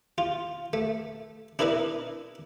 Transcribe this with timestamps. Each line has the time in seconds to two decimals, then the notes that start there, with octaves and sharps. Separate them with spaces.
0.18 F4
0.73 A3
1.59 D4 E4 A#4 B4 D#5